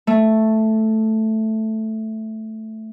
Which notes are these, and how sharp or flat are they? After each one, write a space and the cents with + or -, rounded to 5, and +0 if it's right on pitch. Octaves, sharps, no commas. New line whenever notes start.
A3 +0